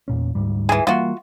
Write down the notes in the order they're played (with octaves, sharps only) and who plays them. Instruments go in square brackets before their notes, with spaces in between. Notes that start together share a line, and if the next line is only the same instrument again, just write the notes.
[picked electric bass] E2 A#2 C#4
D2 G#2 G3
[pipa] E3 G#4
[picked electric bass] E3 G3 A#3 [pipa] F4 F#4